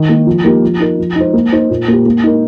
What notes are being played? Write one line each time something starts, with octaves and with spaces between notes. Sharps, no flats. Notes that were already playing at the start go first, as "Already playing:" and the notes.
Already playing: D#3
A#3 D#4
F3
A#3 D#4 G4 A#4
F3
D#4 A#4
F3
D#4 C5
A#3
D#4 C5
A#2
A#3 G4
A#3
D#4 A#4